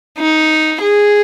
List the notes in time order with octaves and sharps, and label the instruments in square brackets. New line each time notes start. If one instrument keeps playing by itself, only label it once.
[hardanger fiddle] D#4
G#4